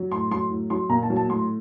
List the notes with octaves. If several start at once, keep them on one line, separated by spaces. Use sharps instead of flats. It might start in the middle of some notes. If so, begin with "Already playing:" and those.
Already playing: F#3
A2 C6
F#3 C6
A2
F#3 C6
A#2 A#5
A5
F#3
A5
A2 C6